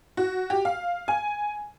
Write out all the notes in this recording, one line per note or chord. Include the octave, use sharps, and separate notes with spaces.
F#4
G4
F5
G#5